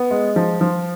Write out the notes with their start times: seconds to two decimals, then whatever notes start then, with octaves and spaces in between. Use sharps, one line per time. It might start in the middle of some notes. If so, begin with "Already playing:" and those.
Already playing: B3
0.11 G#3
0.36 F3
0.61 F3